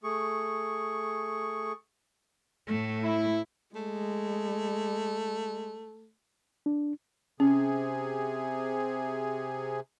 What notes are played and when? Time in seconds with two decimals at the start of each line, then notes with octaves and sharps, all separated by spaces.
0.03 A3 G#4 C#6
2.67 A2 A3
3.02 E4
3.75 G#3 A3
6.66 D4
7.40 C3 C#4 G#4